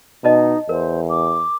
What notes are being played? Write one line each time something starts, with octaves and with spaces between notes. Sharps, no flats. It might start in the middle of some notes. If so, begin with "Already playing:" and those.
B2 D#4 D#5 A5 A#5
E2 A#4 C5
D6